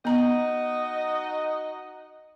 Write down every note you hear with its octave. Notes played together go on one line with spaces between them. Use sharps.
B3 D#4 F#4 D#5 A#5